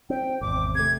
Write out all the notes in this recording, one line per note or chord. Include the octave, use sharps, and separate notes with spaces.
C4 G5
G#1 E2 D6
C3 A3 G#6